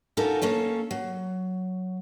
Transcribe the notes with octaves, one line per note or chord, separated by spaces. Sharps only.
C#4 D#4 F4 F#4 A4 A#4
A#3 C#4 A4 C#5
F#3